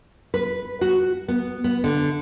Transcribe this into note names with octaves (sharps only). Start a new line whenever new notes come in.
B4
F#4
B3
B3
D3